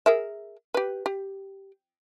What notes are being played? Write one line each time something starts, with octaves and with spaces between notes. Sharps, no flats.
G#4 A#4 E5
G4 B4
G4